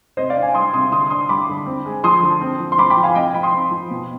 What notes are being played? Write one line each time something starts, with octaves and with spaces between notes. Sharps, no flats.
C3 C5 D#5
D5 F5
D4
F5 G#5
G3 C6 D#6
C3 C6 D#6
D3 C6 D#6
D4 C6 D#6
G3 B5 D6
D3
C4
G#3
F3 C6 D#6
D3
C4
F3
C6
C4 B5 D6
G5 B5
F3
F5 G#5
C4 D#5 G5
F3 G5 B5
C6 D#6
C4
F3
B2